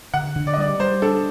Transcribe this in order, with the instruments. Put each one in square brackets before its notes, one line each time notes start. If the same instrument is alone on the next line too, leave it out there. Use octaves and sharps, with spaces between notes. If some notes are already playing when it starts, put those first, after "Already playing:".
[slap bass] D3 [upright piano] F#5
[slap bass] D3
[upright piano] D5
D#5
[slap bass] G3 [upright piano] D5
[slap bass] G3 [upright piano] C5
[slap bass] D4 [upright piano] A4